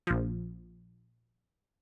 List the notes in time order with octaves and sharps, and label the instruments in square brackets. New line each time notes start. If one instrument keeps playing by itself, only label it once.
[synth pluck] A#1 F3